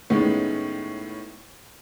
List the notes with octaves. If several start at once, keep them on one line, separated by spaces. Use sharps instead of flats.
A2 D#3 G#3 B3 C#4